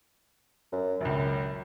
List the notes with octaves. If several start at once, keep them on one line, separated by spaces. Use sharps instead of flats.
F#2
F#1 C#2 F#2